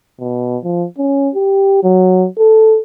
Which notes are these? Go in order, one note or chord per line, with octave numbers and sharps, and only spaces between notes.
B2
F3
C#4
G4
F#3
A4